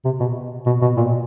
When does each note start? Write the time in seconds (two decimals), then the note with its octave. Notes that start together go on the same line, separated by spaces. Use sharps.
0.05 C3
0.20 B2
0.66 B2
0.82 B2
0.97 A#2